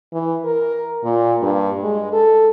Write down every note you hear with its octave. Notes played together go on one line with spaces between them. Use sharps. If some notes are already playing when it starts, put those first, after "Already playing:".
E3
A#4
A#2
G2
G#3
A4